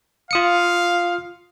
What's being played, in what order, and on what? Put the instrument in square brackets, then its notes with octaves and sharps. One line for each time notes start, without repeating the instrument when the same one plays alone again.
[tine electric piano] F4 D#6 C#7 [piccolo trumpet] F5